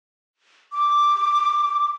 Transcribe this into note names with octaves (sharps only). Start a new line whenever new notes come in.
D6